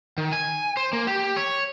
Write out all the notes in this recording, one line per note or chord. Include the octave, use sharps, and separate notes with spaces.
D#3
G#5
C5
A#3
G4
C#5